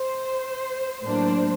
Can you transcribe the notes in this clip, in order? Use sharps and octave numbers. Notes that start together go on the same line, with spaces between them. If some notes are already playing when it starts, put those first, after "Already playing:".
Already playing: C5
A2 F#3 A#3 D4 C5